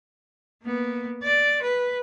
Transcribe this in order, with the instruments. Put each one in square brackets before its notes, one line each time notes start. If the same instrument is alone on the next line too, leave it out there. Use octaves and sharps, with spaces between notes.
[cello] A#3 B3
D5
B4